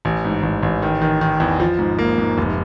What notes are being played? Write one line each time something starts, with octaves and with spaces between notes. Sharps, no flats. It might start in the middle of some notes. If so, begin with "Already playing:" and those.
A1
G#2
A1
A1
D#3
D#3
D#3
E2
F3
G#2
A#3
G#2
F1